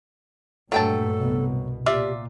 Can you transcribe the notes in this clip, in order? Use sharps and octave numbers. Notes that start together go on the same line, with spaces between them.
G2 A#2 F#3 A3 A4 G5 A5
C2 B2
A#2 F4 G4 D5 E5